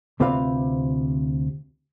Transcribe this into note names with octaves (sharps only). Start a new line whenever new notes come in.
D2 C3 C4 F4 B4 F5